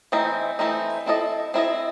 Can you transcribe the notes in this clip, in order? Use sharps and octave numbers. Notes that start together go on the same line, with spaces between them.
E3 A3 C4 D#4
E3 A3 C4 D#4
C4 E4 A4 D#5
C4 E4 A4 D#5